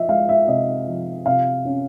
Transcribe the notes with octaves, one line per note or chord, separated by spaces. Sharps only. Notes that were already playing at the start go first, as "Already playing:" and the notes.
Already playing: F3 D#5 E5
G#3 F5
E5
C3 D#5
F3
C3 F5
C#4